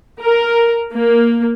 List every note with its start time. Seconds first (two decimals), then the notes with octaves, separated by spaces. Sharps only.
0.22 A#4
0.93 A#3